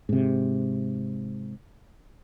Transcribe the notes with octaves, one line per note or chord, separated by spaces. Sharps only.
G#2 C3